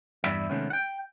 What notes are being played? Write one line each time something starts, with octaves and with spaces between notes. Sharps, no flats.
E2 G2 G3 E4 E5
C3 D#3 G#3 A3 B3 C#4
F#5 G5